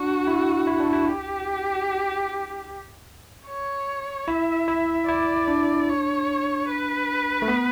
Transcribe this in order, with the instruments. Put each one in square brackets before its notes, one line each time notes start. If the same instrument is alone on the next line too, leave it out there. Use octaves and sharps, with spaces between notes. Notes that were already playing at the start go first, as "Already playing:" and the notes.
Already playing: [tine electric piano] D4 [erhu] F#4
[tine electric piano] E4
E4
D4
E4
[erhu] G4
C#5
[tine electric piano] E4 [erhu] E5
[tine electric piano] E4
[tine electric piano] E4 [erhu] D5
[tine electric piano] D4
[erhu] C#5
B4
[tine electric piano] A3
B3